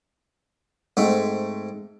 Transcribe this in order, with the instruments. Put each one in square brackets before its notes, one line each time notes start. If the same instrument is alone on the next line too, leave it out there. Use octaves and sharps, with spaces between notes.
[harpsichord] G#2 A3 C4